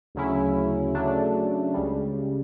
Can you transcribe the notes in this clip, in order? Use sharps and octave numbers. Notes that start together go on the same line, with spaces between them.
D2 C#3 F#3 C#4 E4
C#3 F#3 A3 D4
C#2 C#3 G3